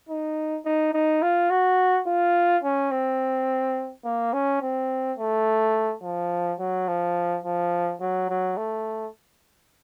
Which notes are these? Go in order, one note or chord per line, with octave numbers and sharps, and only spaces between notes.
D#4
D#4
D#4
F4
F#4
F4
C#4
C4
A#3
C#4
C4
A3
F3
F#3
F3
F3
F#3
F#3
A3